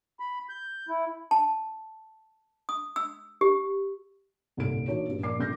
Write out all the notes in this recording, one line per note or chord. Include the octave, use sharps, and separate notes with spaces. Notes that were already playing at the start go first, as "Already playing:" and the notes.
B5
G6
E4
A5
D#6
E6
G4
D#1 C2 A2 D#4 A4 D7
E3 D4 D#4 F#4 A#4 C#5
G2 A#2
A#1 A#4 D5 D6 C7
G1 G6 A#6